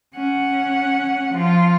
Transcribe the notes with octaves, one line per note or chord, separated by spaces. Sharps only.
C#4 F#5
F3 F4